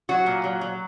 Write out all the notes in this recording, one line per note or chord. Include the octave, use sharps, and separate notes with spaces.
F#3 F#4
A#2
F#3
F#3